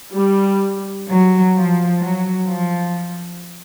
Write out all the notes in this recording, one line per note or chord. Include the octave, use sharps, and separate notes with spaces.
G3
F#3
F3
F#3
F3